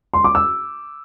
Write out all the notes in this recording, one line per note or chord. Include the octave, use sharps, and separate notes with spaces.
C6
D6
E6